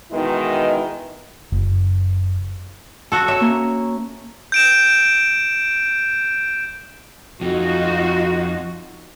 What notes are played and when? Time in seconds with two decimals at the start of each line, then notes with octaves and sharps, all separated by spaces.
0.11 B2 D#3 E3 G#3 E4
1.52 F#1
3.12 F#4 A4
3.28 C#5 E5
3.41 A#3 C#4 A#5
4.52 G6 D7 E7
7.41 F2 D#4 F4 F#4